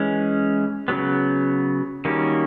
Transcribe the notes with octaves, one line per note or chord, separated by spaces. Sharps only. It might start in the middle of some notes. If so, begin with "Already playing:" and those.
Already playing: E3 G#3 C#4
C#3 F#3 B3
D#3 G3 A#3 C#4 F#4